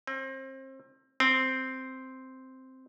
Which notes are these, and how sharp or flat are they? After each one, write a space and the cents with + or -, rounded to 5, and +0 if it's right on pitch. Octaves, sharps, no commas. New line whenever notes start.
C4 +30
C4 -5